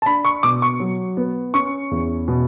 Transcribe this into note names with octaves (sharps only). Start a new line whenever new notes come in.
A5
D4 B5
C#6
B2 D6
C#6
F#3
B3
C#4 C#6
E2
B2